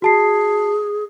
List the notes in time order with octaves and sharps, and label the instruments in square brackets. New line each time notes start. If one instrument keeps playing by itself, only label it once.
[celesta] F#4 A5 C7 [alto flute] G#4